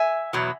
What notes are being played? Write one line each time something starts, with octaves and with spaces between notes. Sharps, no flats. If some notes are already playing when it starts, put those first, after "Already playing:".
Already playing: E5 G#5
E2 B2 F#3